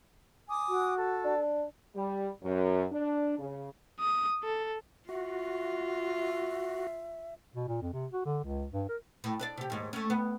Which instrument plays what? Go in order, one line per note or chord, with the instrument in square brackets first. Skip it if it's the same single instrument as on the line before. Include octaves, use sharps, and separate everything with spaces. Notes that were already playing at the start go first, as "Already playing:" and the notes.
[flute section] G#5 D6 D#6
[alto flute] F#4
[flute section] A4
[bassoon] D4
[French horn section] G3
F#2
D4
C#3
[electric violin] D#6
A4
[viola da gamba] F4 [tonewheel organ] F#4 [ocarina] E5
[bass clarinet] B2
A#2
F2
C3
F#4
D3
C#2
G2
A#4
[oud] A2
D4 B4 D5
C3 G4
D#2 G#2
A3 C#4
B3